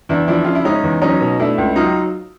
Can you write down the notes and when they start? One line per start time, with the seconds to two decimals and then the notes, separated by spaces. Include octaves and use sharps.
0.09 E2 D4 E4
0.28 F3 D4 E4
0.44 C#3 F4
0.55 E4
0.65 G#3 C#4 D#4
0.83 E2
1.02 F#3 C#4 D#4
1.21 B2
1.40 A3 D4 E4
1.58 C#2
1.76 F#3 D#4 F4